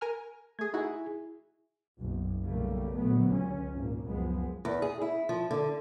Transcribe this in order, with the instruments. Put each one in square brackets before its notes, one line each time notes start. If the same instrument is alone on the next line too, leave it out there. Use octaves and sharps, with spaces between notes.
[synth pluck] A#4 G#5 F6
[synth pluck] A3 G#4 [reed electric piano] G#6
[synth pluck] D#4 F#4 [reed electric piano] E4 G#4
[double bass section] F#1 B1
B1 C#3 G3 A3 A#3
A#1 D3 F#3 A3 B3
C#2 C#4
G#1 A#2 A#3
C#2 F#2 F3 G#3 B3
[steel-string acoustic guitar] E2
G#4
E4
F3
D3